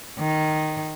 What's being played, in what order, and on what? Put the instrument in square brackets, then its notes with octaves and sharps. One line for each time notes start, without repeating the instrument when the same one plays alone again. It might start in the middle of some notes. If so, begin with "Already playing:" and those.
[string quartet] D#3